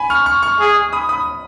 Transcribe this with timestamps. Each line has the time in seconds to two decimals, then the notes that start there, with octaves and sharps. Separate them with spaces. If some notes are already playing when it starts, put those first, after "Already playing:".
Already playing: G#5 B5
0.10 C#6 F6
0.26 C#6 F6
0.42 C#6 F6
0.59 G#4
0.93 B5 D#6
1.09 B5 D#6